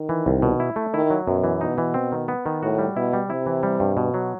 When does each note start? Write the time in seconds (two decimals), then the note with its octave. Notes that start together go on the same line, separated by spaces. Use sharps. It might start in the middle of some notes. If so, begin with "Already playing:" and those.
Already playing: D#3
0.09 E3
0.26 C2
0.42 B2
0.60 E4
0.76 A3
0.93 D#3 E4
1.10 F#3
1.27 F#2 B2
1.44 E3
1.61 B2 D#4
1.78 E3
1.94 C4
2.12 D#3
2.28 B3
2.46 D#3
2.63 A2 F#4
2.78 G3
2.96 B2 E4
3.13 G3
3.29 C3 E4
3.46 E3
3.63 G3
3.80 G2
3.97 B2
4.14 F#3